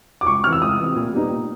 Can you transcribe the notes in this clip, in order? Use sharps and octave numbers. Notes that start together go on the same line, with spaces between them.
D6
C#2 C#6
C3 E3 F6
E6
C#2 D#6
C3 E3
A#2
G3 B3 D#4
A#2